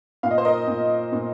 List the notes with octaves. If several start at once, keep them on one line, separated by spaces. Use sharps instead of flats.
A#2 F5
D#5
C5
A#4 D#5
A#2
A#2